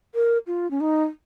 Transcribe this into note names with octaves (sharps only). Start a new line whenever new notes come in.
A#4
F4
C#4
D#4